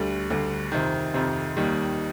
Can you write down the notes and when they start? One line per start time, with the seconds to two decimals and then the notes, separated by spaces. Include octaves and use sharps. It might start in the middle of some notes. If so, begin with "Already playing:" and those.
Already playing: D2 D3 G3
0.30 D2 D3 G3
0.72 F2 C3 D#3
1.14 F2 C3 D#3
1.57 D#2 D#3 G3